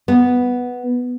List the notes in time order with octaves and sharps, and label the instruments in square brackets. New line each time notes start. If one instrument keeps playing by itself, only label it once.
[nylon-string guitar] B3